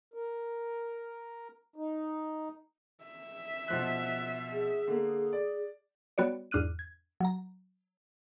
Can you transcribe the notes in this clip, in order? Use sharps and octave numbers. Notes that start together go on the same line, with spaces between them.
A#4
D#4
E5
B2 F3 F#6
G#4
D3 A#3
D5
G3 B3 F#4 C#5 D5
E2 G#2 D4 F6 F#6 D#7
G#6
F#3 A#5